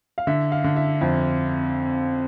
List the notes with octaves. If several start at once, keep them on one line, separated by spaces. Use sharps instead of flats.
F5
D3 E5
F5
D3
E5
F2